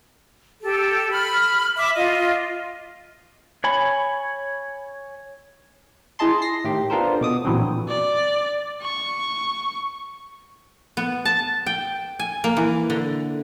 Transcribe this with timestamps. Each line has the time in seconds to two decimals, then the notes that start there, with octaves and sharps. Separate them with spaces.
0.62 G4 A4
1.10 B5 F6
1.76 E5 D6
1.95 F4 D#5
3.64 C#5 G#5 B5
6.19 E4 G#4 D#5 A5 C6
6.42 A#6 C7
6.64 A2 D#3 G4
6.90 B3 D4 F4 A4 A#4 C5
7.21 B2 D6 D#6
7.45 A#2 D3 E3 F#3 B3 C4
7.88 D5
8.82 C#6
10.97 B3
11.25 A5
11.66 G5
12.19 G#5
12.44 A#3
12.57 E3
12.90 D3